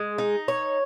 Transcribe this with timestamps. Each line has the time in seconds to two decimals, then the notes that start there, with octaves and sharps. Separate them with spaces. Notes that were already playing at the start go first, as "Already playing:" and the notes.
Already playing: G#3
0.18 D#4
0.48 C#5